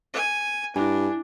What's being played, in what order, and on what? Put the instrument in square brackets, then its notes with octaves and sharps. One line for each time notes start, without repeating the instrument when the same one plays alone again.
[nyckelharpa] G#5
[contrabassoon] G2 [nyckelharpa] D4 [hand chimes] E4 G#5